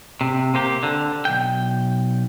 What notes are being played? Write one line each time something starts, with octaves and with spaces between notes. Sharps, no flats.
C3
C3 A#3 G4
D3
B1 G5